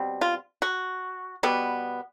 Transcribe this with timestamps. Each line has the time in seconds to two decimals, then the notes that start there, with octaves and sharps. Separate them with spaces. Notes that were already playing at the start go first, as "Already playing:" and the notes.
Already playing: B2 G3 C4
0.21 F4
0.62 F#4
1.43 B2 G3 B3